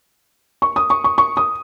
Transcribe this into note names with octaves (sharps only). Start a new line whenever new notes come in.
C#6
D#6
C#6
C#6
C#6
D#6